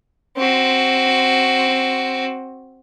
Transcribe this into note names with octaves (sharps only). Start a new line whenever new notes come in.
C4 F#4